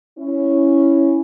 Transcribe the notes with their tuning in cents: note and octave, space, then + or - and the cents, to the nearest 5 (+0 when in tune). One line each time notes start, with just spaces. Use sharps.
C#4 +0 E4 +0